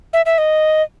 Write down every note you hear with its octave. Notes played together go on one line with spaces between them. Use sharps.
E5
E5
D#5